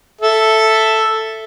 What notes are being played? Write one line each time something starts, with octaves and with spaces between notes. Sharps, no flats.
A4 E5